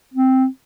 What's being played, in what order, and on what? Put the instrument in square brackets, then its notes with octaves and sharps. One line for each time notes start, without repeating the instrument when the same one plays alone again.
[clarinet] C4